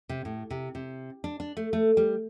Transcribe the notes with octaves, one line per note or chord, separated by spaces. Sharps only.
C3
A2
C3
C3
D4
D4
A3
A3
G3